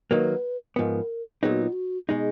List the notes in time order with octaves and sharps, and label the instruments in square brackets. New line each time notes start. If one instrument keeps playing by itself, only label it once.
[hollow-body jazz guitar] D#3 F#3 A#3 [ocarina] B4
[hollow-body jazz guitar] G#2 F3 B3 [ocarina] A#4 B4
[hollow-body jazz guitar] A#2 F#3 B3 D#4 [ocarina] G#4
[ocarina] F#4
F4
F#4
[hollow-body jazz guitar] B2 G#3 D#4 [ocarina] G#4